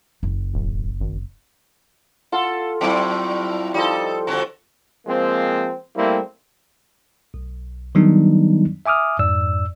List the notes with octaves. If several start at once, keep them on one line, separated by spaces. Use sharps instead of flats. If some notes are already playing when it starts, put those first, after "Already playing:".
F#1
D1
G#1
F4 A4 F#5
A2 F#3 G3 C4 E4 F4
F3 G3 D#4 A4
D3 C4 F#4 A#5
F3 G#3 A#3 C4
G3 A3 A#3 C4 E4
B1
D#3 F#3 G3 B3 D4 D#4
E5 G#5 D6 D#6 F6
F2 G#2 D5 E6